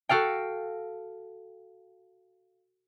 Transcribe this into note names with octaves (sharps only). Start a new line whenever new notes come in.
F#4 A4 F5 G5